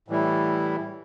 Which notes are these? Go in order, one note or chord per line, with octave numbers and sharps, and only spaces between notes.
A2 E3 G3 E4